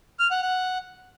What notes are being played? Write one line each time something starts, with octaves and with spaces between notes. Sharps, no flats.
F6
F#5
F#5